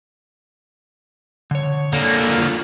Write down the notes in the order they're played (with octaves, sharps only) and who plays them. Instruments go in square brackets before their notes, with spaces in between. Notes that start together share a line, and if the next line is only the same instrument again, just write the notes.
[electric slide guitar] D3 C#5
[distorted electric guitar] D3 A#3 [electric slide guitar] A4
[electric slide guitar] F4